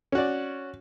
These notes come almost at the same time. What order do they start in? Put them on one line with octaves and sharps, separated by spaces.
C#4 F#4 D5